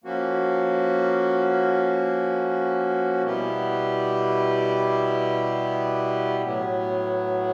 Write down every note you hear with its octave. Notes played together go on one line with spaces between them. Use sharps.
F3 A#3 C#4 F#4
B2 G3 B3 E4 G4
A2 F#3 B3